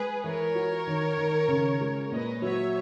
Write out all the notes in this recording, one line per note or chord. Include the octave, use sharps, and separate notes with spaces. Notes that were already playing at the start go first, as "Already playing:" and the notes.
Already playing: G#3 G#4 B4
E3 A#4 C#5
F#4
D#3
D#3
C#3
G#3
A#2 B4 D#5
F#3 C#5 E5